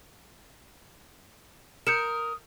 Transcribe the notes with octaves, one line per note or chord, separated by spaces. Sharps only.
A#4 D#6 G6 C#7 E7